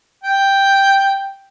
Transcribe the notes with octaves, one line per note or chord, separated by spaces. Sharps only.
G5